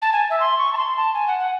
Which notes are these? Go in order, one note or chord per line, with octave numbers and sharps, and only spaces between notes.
A5
G#5
E5
C6
C#6
A5
C6
A5
G#5
F#5
F#5